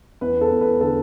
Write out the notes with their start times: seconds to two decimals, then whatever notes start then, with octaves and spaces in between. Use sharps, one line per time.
0.21 E2 B4
0.41 A4
0.51 E2
0.61 B4
0.81 D3 A4